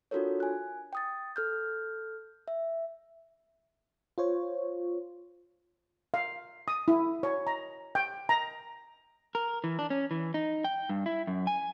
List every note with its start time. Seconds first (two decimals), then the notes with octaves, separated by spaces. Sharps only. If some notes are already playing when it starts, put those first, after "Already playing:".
0.11 D4 F4 F#4 A4 A#4 C#5
0.40 G#5 F#6
0.93 G5 D#6 A6
1.36 A4 F6 G6
2.48 E5
4.18 F4 C5 C#5
6.14 F5
6.68 D#6
6.88 E4
7.23 C#5
7.47 A#5
7.95 G5
8.29 A#5
9.35 A#4
9.64 E3
9.79 D4
9.90 C#4
10.11 E3
10.34 D#4
10.64 G5
10.89 G2
11.06 E4
11.27 F#2
11.47 G#5